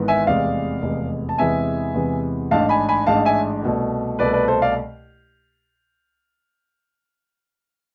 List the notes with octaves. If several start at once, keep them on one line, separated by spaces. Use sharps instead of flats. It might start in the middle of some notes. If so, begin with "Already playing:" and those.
Already playing: G#1 G#2 E3 B3
E5 G#5
F1 E2 C3 G#3 D5 F5
F1 E2 C3 G#3
A5
E2 C3 E3 G#3 E5 G#5
E2 C3 E3 G#3
A1 G#2 G#3 D4 F5 A5
G#5 B5
G#5 B5
A1 G#2 G#3 D4 F5 A5
E5 G#5
C2 B2 A3
C2 B2 A3 B4 D5
B4 D5
A4 C5
D5 F5